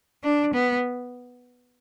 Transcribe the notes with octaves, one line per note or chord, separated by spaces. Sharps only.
D4
B3